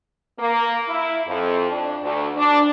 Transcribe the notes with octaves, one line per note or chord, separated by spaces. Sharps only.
A#3
E4
F2
D4
D2
D4